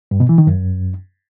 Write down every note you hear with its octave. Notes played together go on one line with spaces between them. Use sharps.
G2
B2
E3
D#3
F#2